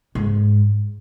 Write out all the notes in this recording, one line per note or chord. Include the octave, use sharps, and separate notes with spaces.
G#2